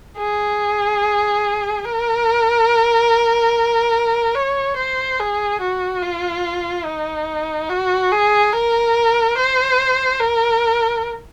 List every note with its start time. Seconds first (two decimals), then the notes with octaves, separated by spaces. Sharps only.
0.18 G#4
1.85 A#4
4.35 C#5
4.77 C5
5.19 G#4
5.61 F#4
6.02 F4
6.86 D#4
7.69 F#4
8.12 G#4
8.53 A#4
9.37 C5
10.20 A#4